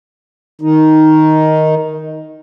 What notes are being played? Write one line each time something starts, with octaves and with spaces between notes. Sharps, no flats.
D#3 D#4